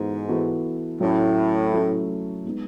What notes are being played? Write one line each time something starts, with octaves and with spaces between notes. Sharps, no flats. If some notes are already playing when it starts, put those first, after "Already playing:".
Already playing: G#2 E3 B3 F#4 A4
E3 B3 F#4 A4
A2 F#3 A3 C#4 E4 A4
F#3 A3 C#4 E4 A4
G#3 B3 D#4